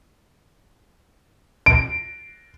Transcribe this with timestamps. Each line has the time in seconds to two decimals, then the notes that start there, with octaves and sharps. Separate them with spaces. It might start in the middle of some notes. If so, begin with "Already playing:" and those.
1.66 D7